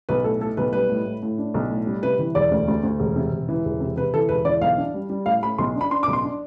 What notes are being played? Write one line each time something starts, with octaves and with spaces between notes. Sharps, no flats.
B1 B4
A2 A4
A2 A4
B1 B4
G3 B4
A2
A2
A2
D4
B1
A2
G3
C3 B4
E3
E1 D5
D2
D2
D2
E1
C3
E1
E3
E1
C3
C3 B4
E3 A4
E1 B4
E3 D5
B1 F5
D4
G3
G3
A2 F5
A2 B5
B1 C6
D4
B5
D4 C6
D6
B1
C6
D4